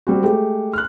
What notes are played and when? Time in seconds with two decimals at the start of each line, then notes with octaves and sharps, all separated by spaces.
0.07 G3 C4 F#4
0.23 G#3 A3 G4
0.73 F6 F#6